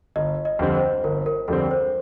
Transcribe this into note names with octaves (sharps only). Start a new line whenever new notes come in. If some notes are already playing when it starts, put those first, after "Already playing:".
G1 D#5
D#5
F2 D3 G3 C4
C5
G1 A#4
A#4
F2 D3 G3 C4 A4
C5